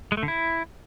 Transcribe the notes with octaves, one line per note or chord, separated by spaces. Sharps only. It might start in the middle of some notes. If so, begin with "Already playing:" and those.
G#3
A3
D3
E4